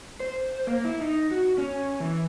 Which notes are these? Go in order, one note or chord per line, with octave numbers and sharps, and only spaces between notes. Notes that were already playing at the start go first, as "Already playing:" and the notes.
C5
A#3
E4
D#4
F#4
C#4
E3